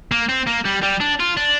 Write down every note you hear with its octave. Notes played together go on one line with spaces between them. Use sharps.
A#3
C4
A#3
G3
G3
D4
F4
D4